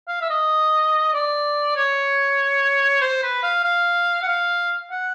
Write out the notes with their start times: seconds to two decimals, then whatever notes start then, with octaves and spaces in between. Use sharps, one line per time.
0.08 F5
0.21 E5
0.30 D#5
1.14 D5
1.76 C#5
3.01 C5
3.23 B4
3.43 F5
3.64 F5
4.22 F#5
4.28 F5
4.91 F#5